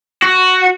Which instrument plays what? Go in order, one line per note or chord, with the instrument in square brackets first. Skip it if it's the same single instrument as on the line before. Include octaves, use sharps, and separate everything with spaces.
[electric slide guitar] F#4